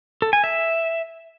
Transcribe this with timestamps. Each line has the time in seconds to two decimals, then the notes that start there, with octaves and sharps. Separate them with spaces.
0.22 A4
0.33 G#5
0.44 E5